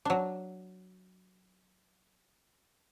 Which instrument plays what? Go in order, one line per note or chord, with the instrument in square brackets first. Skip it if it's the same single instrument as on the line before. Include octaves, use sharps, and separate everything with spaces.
[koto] F#3 D4